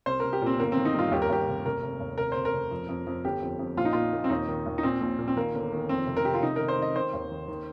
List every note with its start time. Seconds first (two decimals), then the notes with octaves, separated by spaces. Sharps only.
0.06 C2 C5
0.20 C2 A#4
0.33 G4
0.42 A#2 C4
0.59 G1 A#3
0.72 C4
0.77 D#3
0.85 D#4
0.94 G2 F4
1.12 D#2 G4
1.22 A#4
1.29 D#2 G4
1.47 F1
1.65 F1 A#4
1.83 F1
2.00 D#2
2.18 F1 A#4
2.32 F1 C5
2.45 A#4
2.53 F1
2.71 F2
2.89 F2
3.07 F2
3.24 G1 G4
3.42 F2
3.59 F2
3.77 A#1 F4
3.85 D#4
3.93 A#2 F4
4.13 A#2
4.24 C4
4.30 D#2 D#4
4.48 D#3
4.66 D#2
4.78 D#4
4.83 A#2 C4
5.01 A#1
5.19 A#2
5.28 C4
5.37 D#3 A#3
5.54 G1
5.72 D#3
5.89 F2 C4
6.07 F1
6.17 A#4
6.25 C3 G4
6.34 F4
6.43 F1 D#4
6.56 D#3 A#4
6.68 C5
6.78 D#3 D#5
6.96 D#3 C5
7.13 D#2
7.31 D#3
7.48 D#3